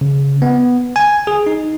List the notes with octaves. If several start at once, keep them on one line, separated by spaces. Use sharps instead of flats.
C#3
B3
G#5
G#4
D#4